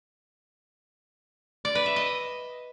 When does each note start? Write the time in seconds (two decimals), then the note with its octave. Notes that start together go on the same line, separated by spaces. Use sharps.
1.65 D5
1.75 B4
1.86 E5
1.96 D#5